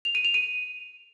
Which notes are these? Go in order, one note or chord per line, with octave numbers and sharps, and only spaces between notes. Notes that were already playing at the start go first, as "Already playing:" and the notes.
F7
D#7
F7
D#7